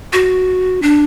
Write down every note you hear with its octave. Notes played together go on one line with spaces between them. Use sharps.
F#4
D4